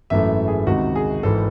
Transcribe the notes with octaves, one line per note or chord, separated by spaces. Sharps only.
G#1 F#2 E3 A3 E5
G#4
C#2 C3 D#3 F#4
G#4
G#1 G#2 E3 A4